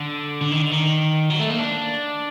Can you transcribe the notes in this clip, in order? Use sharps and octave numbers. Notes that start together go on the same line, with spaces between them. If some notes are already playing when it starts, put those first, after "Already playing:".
Already playing: D3
D3
D#3
D3
D#3
F#3
A3
A#3
D4